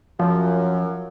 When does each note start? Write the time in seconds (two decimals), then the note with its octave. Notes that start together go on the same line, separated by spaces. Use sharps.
0.20 F#2 F3